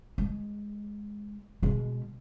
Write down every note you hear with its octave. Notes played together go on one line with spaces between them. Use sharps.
G#3
B2 G#3